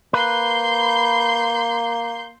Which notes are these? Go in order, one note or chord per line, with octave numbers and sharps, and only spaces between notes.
A#3 B4 C6 G6